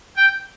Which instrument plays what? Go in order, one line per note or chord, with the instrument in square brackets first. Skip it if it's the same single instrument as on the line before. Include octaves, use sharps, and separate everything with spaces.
[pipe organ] G5